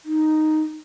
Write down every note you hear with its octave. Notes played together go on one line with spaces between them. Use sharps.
D#4